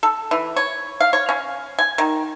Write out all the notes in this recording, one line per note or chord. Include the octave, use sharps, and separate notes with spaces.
A4
E3
C#5
F5
C#5
C#4
G#5
D#3